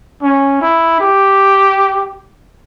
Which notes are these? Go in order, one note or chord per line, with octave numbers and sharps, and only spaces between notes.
C#4
E4
G4